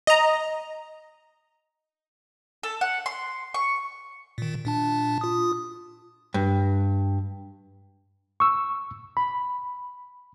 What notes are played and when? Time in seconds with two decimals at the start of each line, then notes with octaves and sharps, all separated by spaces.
0.07 D#5 A#5
2.63 A4
2.81 F#5
3.06 C6
3.54 C#6
4.38 A#2 D#3
4.65 A#2 D4 A5
5.21 F4 D#6
6.34 G2
8.40 C#6 E6
9.17 B5